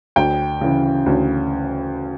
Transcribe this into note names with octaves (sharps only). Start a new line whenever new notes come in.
D2 G5
C#3 E3
D2